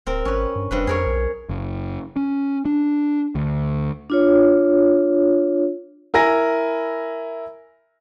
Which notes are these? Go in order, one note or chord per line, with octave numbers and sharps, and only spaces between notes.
D1 C4 A#4
G#1 C#4 B4
G2
F1 G2 C4 B4
F2 G#4 A#4 C#5
B1
F#1
C#4
D4
D2
D4 F4 C#5
E4 A#4 G#5 A#6